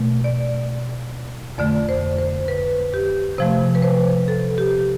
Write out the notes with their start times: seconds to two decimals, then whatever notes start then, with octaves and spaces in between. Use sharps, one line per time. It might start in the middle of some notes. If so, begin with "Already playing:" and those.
Already playing: B2 A3
0.24 D5
1.58 F2 D3 A3 D5
1.89 C5
2.19 C5
2.48 B4
2.94 G4
3.38 C3 F3 A3 C5
3.75 B4
3.82 C5
4.28 A4
4.58 G4